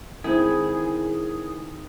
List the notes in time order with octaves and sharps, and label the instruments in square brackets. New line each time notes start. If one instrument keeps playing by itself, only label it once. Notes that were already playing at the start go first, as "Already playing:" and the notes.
[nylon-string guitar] D#3 G#3 C4 [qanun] E4 [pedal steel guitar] G#4